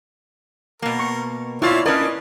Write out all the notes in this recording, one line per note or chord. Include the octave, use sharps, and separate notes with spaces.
B2 A#3 A#4
C#6
B2 C4 E4 F4 C#5 D5 E5
C#4 D4 A#4 B4 D5 D#5